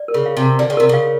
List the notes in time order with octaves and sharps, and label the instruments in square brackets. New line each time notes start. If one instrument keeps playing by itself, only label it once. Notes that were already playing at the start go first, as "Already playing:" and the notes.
Already playing: [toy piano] D5
A#4
[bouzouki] C#3
[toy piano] F5
[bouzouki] C3
[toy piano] A5
[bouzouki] D3 [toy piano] D5
[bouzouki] C#3
[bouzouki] C3 [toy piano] A#4
[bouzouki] C#3 [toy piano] F5